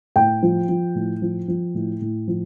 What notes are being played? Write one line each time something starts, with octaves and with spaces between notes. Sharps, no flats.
A2 G5
F3
F3
A2
F3
F3
A2
A2
F3